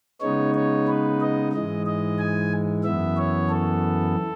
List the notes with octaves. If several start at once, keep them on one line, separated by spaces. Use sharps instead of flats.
C#3 G#3 B3 D#4 C#5
C#5
B4
D#5
G#2 E3 G#3 D#5
D#5
G#5
F#2 E3 B3 E5
C#5
A4